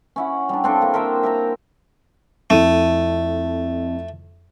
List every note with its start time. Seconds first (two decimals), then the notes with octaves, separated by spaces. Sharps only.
0.16 C#4 E4 F#5
0.49 G3 D4
0.64 C4 D4 A4 F5
0.81 A#3 E4
0.94 A#4 C5 E5 G5
1.23 E5 G5 A#5
2.50 F2 A3 E4 D#7